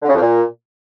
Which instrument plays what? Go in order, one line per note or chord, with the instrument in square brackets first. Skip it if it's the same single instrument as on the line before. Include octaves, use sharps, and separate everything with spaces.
[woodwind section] D3
C#3
F2
A#2